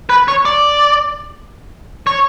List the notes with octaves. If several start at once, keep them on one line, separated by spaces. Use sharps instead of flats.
B4
C#5
D5
C#5